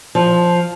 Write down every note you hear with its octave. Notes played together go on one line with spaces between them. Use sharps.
F3